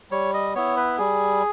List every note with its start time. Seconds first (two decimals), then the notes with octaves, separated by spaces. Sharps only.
0.11 G3 C#5
0.34 D#5
0.55 B3 E4 C#5
0.77 B4
0.98 G3 G#4